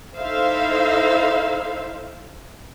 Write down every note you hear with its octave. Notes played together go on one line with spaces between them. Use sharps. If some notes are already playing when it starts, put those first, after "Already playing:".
D#4 E4 A4 C5 E5 F5